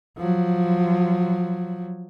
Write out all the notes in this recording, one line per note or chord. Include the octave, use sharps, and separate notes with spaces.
F3 F#3